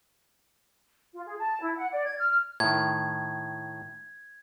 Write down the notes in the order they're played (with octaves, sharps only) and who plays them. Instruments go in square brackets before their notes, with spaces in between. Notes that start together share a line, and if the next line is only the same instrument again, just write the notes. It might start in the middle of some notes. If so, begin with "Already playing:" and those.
[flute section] F4
G#4
A5
E4
F#5
D5
G#6
F6
[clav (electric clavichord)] A2 D#3 [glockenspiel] G#6